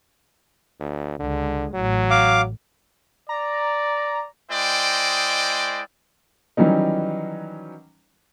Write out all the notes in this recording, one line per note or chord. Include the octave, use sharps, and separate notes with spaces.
D2
C#2 D3 G#3
A1 A2 F#3
F5 D6
D5 A#5
G#3 E4 C5 D5 D#5 G5
D#3 E3 F#3 G3 C#4 D#4